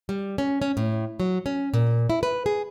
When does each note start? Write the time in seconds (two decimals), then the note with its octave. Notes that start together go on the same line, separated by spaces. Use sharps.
0.09 G3
0.38 C#4
0.62 C#4
0.77 A2
1.20 F#3
1.46 C#4
1.74 A#2
2.10 E4
2.23 B4
2.46 G#4